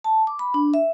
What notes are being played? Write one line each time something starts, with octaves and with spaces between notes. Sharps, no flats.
A5
D6
B5
D4
E5